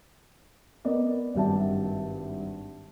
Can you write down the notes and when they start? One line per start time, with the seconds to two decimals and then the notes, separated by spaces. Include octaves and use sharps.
0.85 B3 A#4 D5 D#5
1.35 G#1 G2 G4 E5 A5